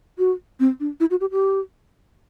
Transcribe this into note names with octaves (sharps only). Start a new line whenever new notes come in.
F#4
C4
D4
E4
F#4
G4
G4